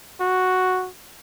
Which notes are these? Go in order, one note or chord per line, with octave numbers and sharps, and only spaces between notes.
F#4